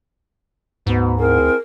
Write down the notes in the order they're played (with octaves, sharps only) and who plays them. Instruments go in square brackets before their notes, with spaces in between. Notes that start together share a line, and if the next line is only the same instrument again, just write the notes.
[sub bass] D2 [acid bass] G#2 [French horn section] B2 B3
[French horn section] C4 E4 G#4 [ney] A#4